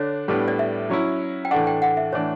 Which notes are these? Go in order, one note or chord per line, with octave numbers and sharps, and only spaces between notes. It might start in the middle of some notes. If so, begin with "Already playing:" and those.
Already playing: D3 D4 C#5
A2 G3 B3 D4
D5
E5
F#3 C#4 E4
G5
A2 E3 A3 D4 F#5
G5
F#5
E5
A2 E3 A3 D4 C#5